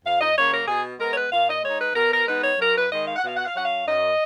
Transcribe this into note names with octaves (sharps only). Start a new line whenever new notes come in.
F2 F5
D#5
C#3 F#3 A#3 C#5
A#4
B2 G#4
G#3 B3 A#4
C#5
B4
A#2 F5
D#5
G#3 D#4 C#5
B4
B2 A#4
A#4
G#3 B3 D#4 B4
C#5
F#2 A#4
B4
D#3 G#3 D#4 D#5
F5
F#5
B2 F5
F#5
F5
F#3 C#4 F#5
F5
F#2 D#5